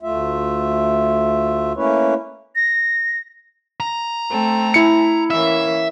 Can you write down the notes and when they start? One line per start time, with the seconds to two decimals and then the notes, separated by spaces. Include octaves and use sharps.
0.03 D2 A3 F4 E5
1.76 A3 A#3 C#4 E4 B4 C#5
2.55 A#6
3.80 A#5
4.29 A3 C4 A4
4.74 E4 C#7
5.30 E3 A#3 C#4 E5